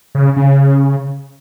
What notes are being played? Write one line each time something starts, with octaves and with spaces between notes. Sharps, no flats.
C#3
C#3